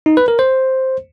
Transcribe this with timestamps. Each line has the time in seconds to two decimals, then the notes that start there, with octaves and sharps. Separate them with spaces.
0.06 D#4
0.17 B4
0.28 A#4
0.39 C5